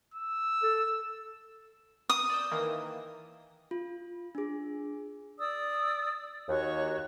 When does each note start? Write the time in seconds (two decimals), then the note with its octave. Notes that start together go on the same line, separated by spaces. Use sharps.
0.14 E6
0.63 A4
2.09 D#6
2.30 D5 E6 G6
2.51 D#3 E3 A#3
3.71 F4
4.35 D4 G#4
5.39 D5 D#6 E6
6.49 D#2 F#4 C#5 C#6